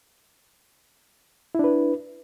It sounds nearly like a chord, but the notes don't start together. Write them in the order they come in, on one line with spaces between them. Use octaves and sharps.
E4 D4 B4